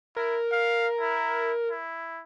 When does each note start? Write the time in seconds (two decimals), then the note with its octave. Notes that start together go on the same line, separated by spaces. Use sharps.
0.16 E4 A#4
0.52 F5
1.00 E4
1.71 E4